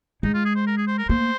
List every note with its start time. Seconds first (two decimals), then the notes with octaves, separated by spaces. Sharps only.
0.23 G#3 D#4
0.34 F4
0.45 G#4
0.56 C5
0.67 A#4
0.77 G#4
0.87 C5
0.98 A#4
1.09 A#3 C5